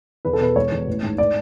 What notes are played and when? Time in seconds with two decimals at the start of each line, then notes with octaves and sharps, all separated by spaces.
0.25 E2 B4
0.33 A4
0.40 B2 B4
0.56 E1 C#5
0.72 E2
0.87 A1
1.03 G#2
1.18 D5